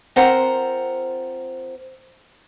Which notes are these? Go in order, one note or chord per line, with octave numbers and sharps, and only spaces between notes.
C4 F4 A#4 C5 F#5 A#5